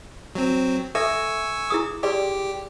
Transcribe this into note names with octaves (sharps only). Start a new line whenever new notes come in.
F#3 C4
A4 E5 G#5 C#6 E6
E4 G#4 D#6
G4 G#4 D5 C6